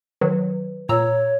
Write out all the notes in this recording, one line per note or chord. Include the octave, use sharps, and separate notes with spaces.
D#3 F#3 B4
A#2 C#5 A#5 E6